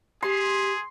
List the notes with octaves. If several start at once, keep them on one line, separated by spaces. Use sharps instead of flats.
G4 G#4 C6